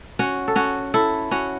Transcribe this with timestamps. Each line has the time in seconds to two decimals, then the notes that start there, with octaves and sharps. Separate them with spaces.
0.19 C#4 F#4
0.48 A4
0.56 C#4 F#4
0.94 E4 A4
1.31 C#4 F#4